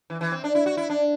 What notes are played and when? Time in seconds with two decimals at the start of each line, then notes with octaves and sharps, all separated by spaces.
0.10 E3
0.21 E3
0.32 C4
0.44 D4
0.55 E4
0.66 F#4
0.77 E4
0.90 D4